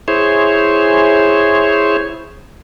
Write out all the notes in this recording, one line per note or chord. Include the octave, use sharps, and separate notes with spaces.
E4 G#4 C5 C#5